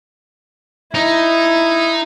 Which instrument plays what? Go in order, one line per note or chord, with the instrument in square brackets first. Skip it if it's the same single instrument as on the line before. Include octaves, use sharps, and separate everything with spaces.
[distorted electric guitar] D#4 [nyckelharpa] E4